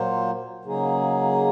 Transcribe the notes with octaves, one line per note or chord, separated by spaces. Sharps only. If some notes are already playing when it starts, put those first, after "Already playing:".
Already playing: A#2 F#3 A#3 F4 C5
C#3 F#3 A#3 D#4 G#4